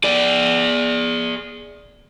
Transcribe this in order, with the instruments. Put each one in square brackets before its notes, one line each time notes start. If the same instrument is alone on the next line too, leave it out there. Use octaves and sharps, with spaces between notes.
[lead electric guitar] G#4 D5